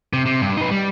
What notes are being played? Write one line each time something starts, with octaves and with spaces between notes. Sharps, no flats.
C3
C3
G2
D#4 B4
G3